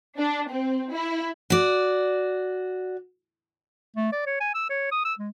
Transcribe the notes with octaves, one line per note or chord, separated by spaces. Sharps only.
D4
C4
E4
F#4 D5
A3
D5
C#5
G#5
E6
C#5
D#6
E6
G#3